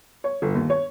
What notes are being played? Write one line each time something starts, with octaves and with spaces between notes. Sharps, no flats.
C#5
G1
D#2
C#5